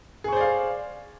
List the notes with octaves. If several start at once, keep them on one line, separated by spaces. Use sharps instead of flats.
G#4 C5 D5 F5 C#6